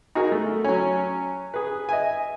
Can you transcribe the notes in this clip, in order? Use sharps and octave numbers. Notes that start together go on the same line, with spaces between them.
D#4 F#4 G#4 A#4
A3
F#3 C#4
G#4 B4
D#5 E5 G#5